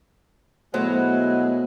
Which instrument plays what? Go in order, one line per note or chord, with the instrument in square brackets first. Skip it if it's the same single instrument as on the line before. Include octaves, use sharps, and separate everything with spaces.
[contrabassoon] B2 [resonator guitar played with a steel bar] F#3 [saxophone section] G#3 E4 D#5 [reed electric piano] A3 C5